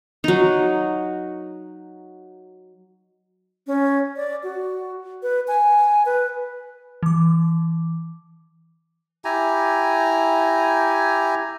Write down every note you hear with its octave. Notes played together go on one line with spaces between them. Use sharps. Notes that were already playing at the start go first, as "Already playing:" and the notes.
F#3 D#4
C#4
D5
F#4
B4
G#5
B4
E3 D6
E4 G4 G#5 A#5